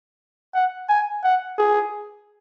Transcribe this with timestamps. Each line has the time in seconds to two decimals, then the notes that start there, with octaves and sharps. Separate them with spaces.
0.55 F#5
0.89 G#5
1.24 F#5
1.59 G#4